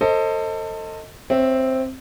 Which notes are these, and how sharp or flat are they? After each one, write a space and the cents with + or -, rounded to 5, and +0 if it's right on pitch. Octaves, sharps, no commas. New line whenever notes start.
A4 +30 C5 +25 D#5 +10
C4 +0 C#5 -20 E5 +0